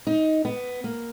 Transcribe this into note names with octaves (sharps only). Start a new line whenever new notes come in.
D#4
B3
A#3